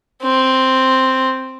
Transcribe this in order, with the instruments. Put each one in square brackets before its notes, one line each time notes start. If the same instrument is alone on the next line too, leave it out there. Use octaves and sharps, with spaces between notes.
[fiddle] C4